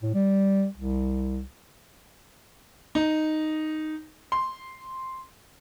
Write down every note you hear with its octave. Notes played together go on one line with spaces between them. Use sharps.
A2
G3
C2
D#4
C6